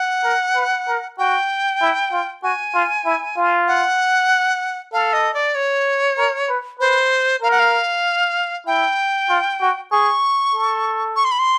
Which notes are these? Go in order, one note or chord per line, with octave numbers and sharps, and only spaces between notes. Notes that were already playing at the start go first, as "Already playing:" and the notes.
Already playing: F#5
A#4
B4
A#4
F#4 G5
E4
F4
F#4 G#5
F4
E4
F4
F#5
A4 F5
D#5
D5
C#5
A#4
B4
B4 C5
A#4 F5
F#5
F5
E4 G5
F4
F#4
G#4 C#6
A4
C#6
C6
B5
C6